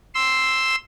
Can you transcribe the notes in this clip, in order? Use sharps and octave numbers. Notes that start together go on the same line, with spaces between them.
C6 E6